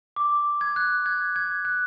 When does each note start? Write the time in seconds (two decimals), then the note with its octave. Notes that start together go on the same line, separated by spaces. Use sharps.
0.16 D6
0.61 G#6
0.76 F#6
1.06 G#6
1.36 G#6
1.65 F#6